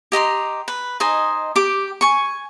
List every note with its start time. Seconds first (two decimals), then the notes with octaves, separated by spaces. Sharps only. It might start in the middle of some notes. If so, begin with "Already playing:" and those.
0.12 G4 D#5 A#5 C6
0.68 B4
1.00 D#4 C5 D#5 G#5
1.56 G4 D6
2.01 G#5 C#6